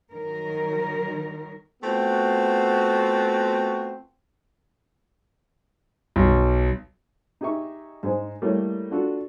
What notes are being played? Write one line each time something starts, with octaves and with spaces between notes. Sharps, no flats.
D#3 F#3 A#4
A3 B3 C4 F4 F#4
B1
D#4 G4 G#4 E5 C#6
G#2 G#3 D#4 C5
G3 A3 A#3 E4 A4 C#5
D4 F4 F#4 A4